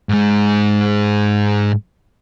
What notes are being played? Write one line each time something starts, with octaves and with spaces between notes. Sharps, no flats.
G#2 G#3